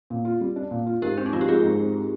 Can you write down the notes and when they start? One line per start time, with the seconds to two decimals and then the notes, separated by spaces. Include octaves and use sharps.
0.10 A#2
0.25 F4
0.41 G3
0.56 D4
0.71 A#2
0.86 F4
1.02 G#2 G4 A#4
1.17 C4 D4
1.26 D#4
1.33 F3 F4
1.41 G4
1.48 G#3 F4 G#4
1.63 G#2
1.79 C4